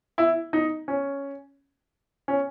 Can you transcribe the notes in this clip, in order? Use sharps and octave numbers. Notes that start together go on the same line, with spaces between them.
E4
D#4
C#4
C#4